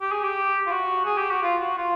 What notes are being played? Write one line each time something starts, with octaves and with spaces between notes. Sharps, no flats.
G4
G#4
G4
F4
F#4
G#4
G4
F#4
F4
F#4
F4